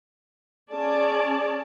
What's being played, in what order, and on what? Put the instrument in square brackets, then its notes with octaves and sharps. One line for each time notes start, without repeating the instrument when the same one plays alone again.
[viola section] C#4 G#4 D5 A5